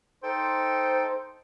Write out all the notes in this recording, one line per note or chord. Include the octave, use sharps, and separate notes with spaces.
D#4 A4 C5 G5